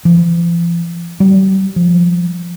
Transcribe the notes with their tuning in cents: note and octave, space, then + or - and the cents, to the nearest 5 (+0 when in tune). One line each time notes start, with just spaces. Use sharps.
F3 -45
G3 -35
F3 +0